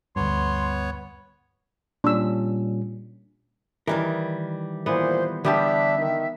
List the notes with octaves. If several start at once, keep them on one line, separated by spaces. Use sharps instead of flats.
D2 G2 B3 C#5 C6
A#2 G3 C#4 D4 E6
D#3 E3 G3 A#4
A#2 E3 B3 C5
D3 G3 B3 D4 G4 E5 A5
D#3